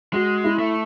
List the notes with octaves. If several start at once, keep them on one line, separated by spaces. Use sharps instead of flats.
G#3 F#4
E4
A3